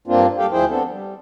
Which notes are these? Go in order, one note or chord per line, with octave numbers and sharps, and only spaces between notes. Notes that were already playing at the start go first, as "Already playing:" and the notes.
G2 A#3 C4 D4 F4
G3 G4 A4 F5 G5
D2 F3 E4 G#4 C5 G5
B3 C4 D4 A4
G3